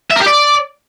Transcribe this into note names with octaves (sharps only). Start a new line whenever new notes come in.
E5
A#4
G4
D5